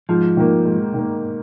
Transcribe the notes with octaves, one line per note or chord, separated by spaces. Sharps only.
G#2 F3
D#3 A#3
G#2
D#3 A#3